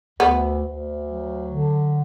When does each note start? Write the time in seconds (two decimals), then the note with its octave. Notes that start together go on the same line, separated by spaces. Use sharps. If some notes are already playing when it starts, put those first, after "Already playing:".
0.20 D2 B3
0.63 D2
1.06 F#3
1.49 D3